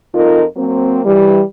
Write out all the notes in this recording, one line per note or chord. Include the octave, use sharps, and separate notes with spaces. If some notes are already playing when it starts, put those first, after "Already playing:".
F2 D#4 F4 A#4 D#5
F#3 A#3 C4
E3 G3